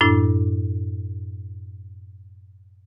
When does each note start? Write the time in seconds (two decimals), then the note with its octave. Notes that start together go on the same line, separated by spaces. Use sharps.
0.01 F#2 A2 D4 E4